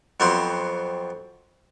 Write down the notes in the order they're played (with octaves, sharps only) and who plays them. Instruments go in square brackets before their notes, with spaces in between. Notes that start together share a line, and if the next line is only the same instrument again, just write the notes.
[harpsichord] F2 F#3 B3 C4 C5 C6